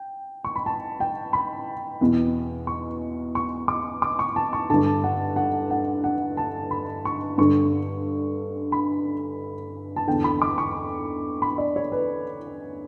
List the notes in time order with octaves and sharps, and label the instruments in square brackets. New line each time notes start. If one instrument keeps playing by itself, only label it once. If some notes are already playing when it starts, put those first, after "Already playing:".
Already playing: [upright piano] G5
C#6
B5
A5
G5
B5
E2 B2
C#6
C#6
D6
D6
C#6
A5
C#6
G2 D3 A5
F#5
F#5
F#5
F#5
A5
B5
C#6
G2 D3 C#6
B5
A5
E2 D3 G5
B5
D6
C#6
B5
D5
C#5
B4